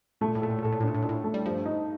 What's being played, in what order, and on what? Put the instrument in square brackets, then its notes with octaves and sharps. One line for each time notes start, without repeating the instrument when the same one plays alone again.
[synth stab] A2 [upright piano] A3
[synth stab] A#2
A2
[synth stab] A#2 [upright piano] A4
[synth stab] A2
A#2
[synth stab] A2 [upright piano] A4
[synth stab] A#2
A2
[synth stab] A#2 [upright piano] D4
[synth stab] A2
[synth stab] A#2 [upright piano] D4
[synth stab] A2
[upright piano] A3
[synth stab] G3
[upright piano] G2 [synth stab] F3
[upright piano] D#4